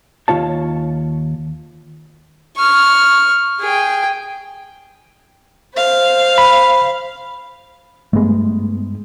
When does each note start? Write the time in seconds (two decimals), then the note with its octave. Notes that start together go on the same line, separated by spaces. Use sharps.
0.28 D#2 F#3 F4 C#5 A5
2.57 C#6 F6
3.60 G#4 G5
5.75 C5 F5
6.38 B5
8.13 G2 G#3 A3 B3